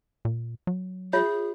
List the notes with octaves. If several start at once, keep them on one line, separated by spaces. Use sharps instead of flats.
A#2
F#3
F4 G#4 C#5 E5